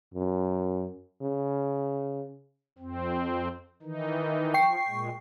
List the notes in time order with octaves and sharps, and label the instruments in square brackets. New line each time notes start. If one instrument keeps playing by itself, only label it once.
[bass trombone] F#2
C#3
[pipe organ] F2 C4
D#3 E3 D#4
[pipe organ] F3 [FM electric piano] G5 C#6 C7
[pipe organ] A#2 G#3